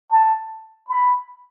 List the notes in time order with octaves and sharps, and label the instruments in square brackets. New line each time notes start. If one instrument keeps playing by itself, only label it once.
[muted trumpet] A5
B5